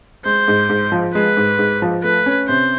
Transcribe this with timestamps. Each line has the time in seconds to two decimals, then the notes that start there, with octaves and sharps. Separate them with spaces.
0.25 G#3 C5
0.48 G#2
0.69 G#2
0.92 F3
1.14 G#3 B4
1.37 G#2
1.59 G#2
1.82 F3
2.03 A3 B4
2.26 C#4
2.48 C3 C5